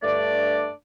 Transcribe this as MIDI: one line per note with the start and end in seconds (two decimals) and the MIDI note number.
0.03 0.68 43
0.03 0.68 57
0.03 0.68 62
0.03 0.68 74